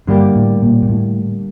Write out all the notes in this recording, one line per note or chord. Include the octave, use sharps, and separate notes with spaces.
G2 D3 G3 A#3 D4 G4
A2
A#2
A#2
A2